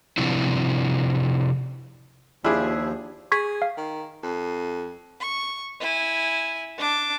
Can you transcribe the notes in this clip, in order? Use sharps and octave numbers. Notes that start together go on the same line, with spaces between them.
C3 F3 C4 D4 E4
D#2 F3 D4 E4 F4 G4 G#4
G#4 C#6 G#6 B6
F5
D#3
F2
C#6
E4 G#5
D4 D6